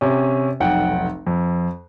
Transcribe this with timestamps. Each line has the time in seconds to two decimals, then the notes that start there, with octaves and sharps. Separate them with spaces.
0.01 C3 C#4
0.60 F1 B1 F#5 G5
1.27 F2